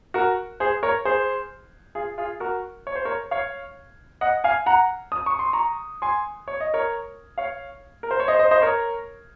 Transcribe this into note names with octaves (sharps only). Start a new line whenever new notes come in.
F#4 A#4
G#4 C5
A#4 C#5
G#4 C5
F4 G#4
F4 G#4
F#4 A#4
C#5
C5
A#4 C#5
C#5 F5
D#5 F#5
F5 G#5
F#5 A#5
D#6
C#6
C6
A#5 C#6
G#5 C6
C#5
D#5
A#4 C#5
C#5 F5
A#4
C5
C#5
C5 D#5
C5 D#5
C5 D#5
A#4 C#5